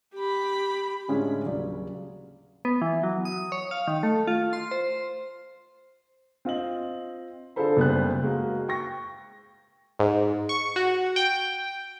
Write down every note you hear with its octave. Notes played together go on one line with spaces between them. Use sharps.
G4 B5
A2 D3 G#3 C#4 F4 G#4
D#1 C#3 F#3 D5
B3
E3
F#3
D#6
C#5
F5
D#3
A3
F4
C6
C5
C4 F4 D#5 F#7
D3 F4 G#4 A4 C5 B5
F#1 G3 B3 C5 A5 F#6
G#3 A#3 F#4
G5 C#6 A#6
G#2
C#6
F#4
G5